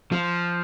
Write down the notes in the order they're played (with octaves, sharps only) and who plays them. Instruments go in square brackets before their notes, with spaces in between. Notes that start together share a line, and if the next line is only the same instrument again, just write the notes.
[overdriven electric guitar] F3